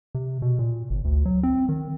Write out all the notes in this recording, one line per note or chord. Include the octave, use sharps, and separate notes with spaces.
C3
B2
A#2
G1
D2
F#3
C4
D#3